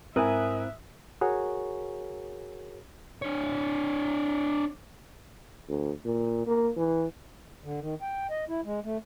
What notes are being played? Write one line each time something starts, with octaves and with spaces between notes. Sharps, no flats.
G#2 C4 E4 A#4 E5 G#5 D#6 F#6
F#4 G#4 A#4 C#5
D4 C#5
D2
A#2
A#3
E3
D3
D#3
G5
D#5
E4
G#3
A3